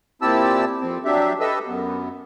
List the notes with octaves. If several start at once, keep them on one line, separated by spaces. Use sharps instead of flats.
A#2 C4 E4 G4 A5 E6
F2 C4
F#3 D4 G4 E5
G4 A4 B4 D#5 E5 E6
F#2 B3